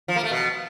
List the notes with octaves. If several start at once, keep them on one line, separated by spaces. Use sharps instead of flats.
F3
A#3
A3
B2